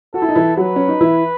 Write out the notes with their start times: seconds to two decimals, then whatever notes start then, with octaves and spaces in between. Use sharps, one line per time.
0.14 F#4 A4
0.22 E4
0.29 D#4
0.35 E3 E4
0.57 F#3 F#4 B4
0.76 C#4
0.88 D#4
1.01 E3 E4